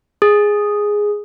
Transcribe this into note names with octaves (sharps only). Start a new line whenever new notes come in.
G#4